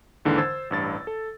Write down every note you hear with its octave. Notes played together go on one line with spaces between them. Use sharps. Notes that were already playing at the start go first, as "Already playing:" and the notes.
D#2 G#2 D3 E3
C5 E6 G#6 A6
A1 G2 A6
A4